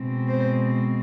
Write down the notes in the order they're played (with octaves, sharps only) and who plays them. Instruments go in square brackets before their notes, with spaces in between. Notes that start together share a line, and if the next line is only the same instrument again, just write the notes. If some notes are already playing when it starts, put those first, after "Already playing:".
Already playing: [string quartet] B2 G#3 C4
C5